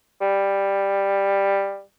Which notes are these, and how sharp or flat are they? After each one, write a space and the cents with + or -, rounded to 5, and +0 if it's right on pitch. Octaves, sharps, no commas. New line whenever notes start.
G3 +10